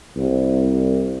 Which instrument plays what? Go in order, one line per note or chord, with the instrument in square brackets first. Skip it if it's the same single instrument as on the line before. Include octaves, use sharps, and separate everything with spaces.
[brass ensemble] C2